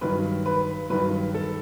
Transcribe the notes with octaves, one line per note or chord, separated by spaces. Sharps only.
G2 D#3 F#3 B4
B4
G2 D#3 F#3 B4
A4